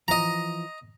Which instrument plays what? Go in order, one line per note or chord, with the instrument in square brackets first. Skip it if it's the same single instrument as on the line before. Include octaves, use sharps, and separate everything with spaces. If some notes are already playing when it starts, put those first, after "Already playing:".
[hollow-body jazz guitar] E3 F3 [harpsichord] D#5 A#5